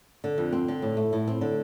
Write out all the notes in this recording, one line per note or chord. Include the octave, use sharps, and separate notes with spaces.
D3
F2
C4
D3
A2
A3
A2
C4
D3